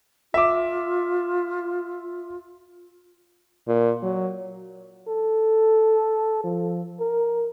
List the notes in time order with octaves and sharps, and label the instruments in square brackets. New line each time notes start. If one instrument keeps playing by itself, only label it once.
[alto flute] F4 [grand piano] E5 D6
[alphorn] A#2
F#3
[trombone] A4
F3
A#4